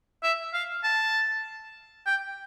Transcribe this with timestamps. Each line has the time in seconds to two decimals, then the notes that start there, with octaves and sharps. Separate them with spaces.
0.23 E5
0.54 F5
0.84 A5
2.06 G5